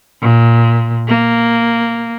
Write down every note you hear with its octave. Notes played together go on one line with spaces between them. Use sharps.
A#2
A#3